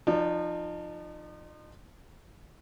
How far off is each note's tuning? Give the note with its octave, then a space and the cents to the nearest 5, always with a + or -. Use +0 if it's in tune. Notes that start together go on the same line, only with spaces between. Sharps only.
F3 +0 D#4 -35 D5 +0